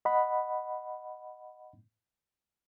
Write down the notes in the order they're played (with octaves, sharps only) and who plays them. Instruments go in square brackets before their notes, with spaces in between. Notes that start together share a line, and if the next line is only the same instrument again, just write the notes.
[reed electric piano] D#5 F#5 B5